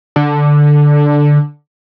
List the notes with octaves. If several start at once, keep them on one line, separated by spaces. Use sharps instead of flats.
D3